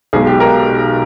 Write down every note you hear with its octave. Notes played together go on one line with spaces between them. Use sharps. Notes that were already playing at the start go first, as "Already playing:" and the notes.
B1 B2 G#3 G#4
G4
A#4